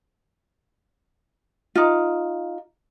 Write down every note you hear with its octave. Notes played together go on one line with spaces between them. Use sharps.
D#4 F4